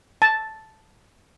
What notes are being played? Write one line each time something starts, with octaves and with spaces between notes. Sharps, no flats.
A5